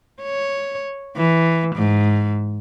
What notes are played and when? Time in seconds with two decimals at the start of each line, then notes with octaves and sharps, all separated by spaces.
0.23 C#5
1.16 E3
1.75 G#2